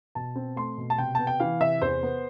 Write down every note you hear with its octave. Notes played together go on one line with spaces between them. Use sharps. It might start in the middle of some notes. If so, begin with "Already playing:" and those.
B2 A5
C4
A3 C6
B2
A5
C3 G5
B3 A5
G5
E3 F5
C3 E5
E2 C5
B3